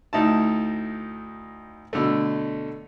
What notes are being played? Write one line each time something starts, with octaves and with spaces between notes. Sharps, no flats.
D2 D#4 E4 A5
B2 D3 A3